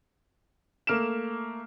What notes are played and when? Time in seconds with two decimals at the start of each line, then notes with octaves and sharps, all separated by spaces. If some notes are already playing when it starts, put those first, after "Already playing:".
0.87 A3 A#3 F6 D7 E7